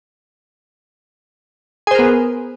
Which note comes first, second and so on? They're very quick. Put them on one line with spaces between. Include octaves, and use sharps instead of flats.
G#4 C5 A#4 B3